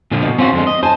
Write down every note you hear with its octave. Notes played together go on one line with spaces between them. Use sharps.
A#2 D3 F3
B2
C4 C#4 F4 F#4
F2 D3 G#3
D#5
C5 G#5 A5